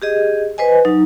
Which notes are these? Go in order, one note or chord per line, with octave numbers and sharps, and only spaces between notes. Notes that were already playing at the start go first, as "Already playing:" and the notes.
G4 G#4 D#5
B4 C5 D#5 G#5
F#3 D#4